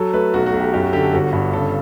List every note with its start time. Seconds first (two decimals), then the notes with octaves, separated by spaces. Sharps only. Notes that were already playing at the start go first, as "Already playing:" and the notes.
Already playing: F#3 A4
0.13 A3 B4
0.34 B1 F#4
0.46 F#4
0.53 B1
0.59 G4
0.73 F#2 G4
0.83 F#4
0.93 D3 G4
1.03 A4
1.13 G1 F#4
1.33 G2
1.53 C#3 A4